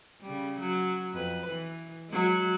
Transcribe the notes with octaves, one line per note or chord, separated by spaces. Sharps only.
C#3 G3
F#3
F2 B4
E3
F#3 G#3